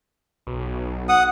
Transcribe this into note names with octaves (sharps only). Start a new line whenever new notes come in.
B1
F#5 D#6